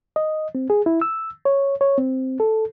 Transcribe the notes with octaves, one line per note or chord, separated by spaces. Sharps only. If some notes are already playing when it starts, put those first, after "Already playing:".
D#5
C4
G#4
E4
E6
C#5
C#5
C4
A4